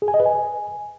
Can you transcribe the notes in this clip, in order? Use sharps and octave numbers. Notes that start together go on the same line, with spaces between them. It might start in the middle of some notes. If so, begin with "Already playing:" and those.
G#4
G#5
D#5
B4
G#5